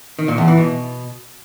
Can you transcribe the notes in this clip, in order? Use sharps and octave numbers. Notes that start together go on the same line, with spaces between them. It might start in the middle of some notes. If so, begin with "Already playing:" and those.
D#3
A#2
E2
E3
B2